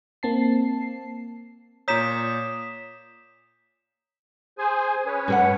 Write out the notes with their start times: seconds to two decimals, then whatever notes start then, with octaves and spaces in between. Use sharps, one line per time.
0.23 A#3 C4 A5 C7
1.88 A#2 C#5 A#5 D#6 G6 B6 E7
4.58 G#4 C5 G#5
5.06 C#4 B4 C#5
5.28 G2 G#4 F#5